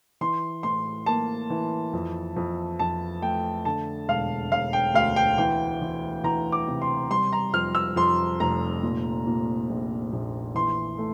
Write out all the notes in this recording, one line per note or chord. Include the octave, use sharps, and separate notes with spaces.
E3 C6
A2 C6
A#3 A5
E3
F2
F2
F2 A5
A3 G5
D3 A5
E1 F5
E1 F5
G5
D2 F5
G5
E3 G5
E3
E3 A#5
D6
C3
C6
G3 C6
A#5
F2 F6
E6
F2 C6
F1 A#5
A#2
A#2
A#1
A#1
E3 C6
A3